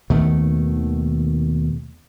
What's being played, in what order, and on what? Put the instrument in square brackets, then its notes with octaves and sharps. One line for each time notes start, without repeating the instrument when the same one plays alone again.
[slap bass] D#2 B2 D#3 A3